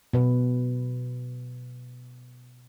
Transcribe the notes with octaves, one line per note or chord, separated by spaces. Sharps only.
B2 B4